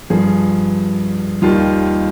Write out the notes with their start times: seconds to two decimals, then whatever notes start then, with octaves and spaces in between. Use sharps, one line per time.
0.10 G2 F3 G#4
1.42 D#2 D#3 G3 F4